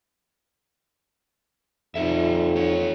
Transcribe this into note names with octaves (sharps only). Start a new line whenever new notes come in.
F2 D#4 G4 E5
G4 C#5